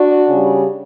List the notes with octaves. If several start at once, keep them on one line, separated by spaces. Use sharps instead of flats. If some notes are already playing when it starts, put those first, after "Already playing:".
Already playing: D4 F#4
C#3 G3